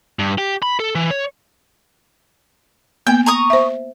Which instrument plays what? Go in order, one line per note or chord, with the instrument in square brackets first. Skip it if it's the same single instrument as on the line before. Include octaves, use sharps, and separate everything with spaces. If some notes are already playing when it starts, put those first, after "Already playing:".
[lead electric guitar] G2
G4
B5
A4
E3
C#5
[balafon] A#3 B3 [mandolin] G5
[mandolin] A#5 C#6 D#6
[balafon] C5 E5